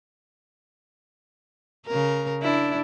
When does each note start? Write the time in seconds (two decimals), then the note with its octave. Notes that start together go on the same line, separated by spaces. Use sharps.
1.87 C#3 A#4
2.42 D4 E4